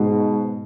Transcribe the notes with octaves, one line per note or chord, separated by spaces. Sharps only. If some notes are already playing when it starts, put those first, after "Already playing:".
Already playing: G#2 B2